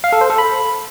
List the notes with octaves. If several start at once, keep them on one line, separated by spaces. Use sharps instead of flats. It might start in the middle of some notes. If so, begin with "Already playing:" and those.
F5
A4
C5
A4
B5